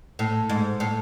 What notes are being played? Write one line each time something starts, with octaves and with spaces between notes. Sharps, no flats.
A2
G#2
A2